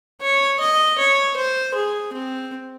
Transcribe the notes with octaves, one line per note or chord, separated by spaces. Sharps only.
C#5
D#5
C#5
C5
G#4
C4